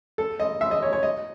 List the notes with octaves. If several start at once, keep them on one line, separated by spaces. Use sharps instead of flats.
A4
D#5
E5
D#5
C#5
C#5
D#5